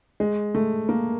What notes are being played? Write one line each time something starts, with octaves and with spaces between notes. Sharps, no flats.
G#3
A3
A#3